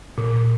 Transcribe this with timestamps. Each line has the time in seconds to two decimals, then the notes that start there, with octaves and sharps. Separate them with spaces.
0.18 A#2